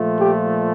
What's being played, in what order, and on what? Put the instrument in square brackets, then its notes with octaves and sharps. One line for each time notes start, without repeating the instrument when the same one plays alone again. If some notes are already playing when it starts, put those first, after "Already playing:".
Already playing: [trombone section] A#2 F3 A3
G4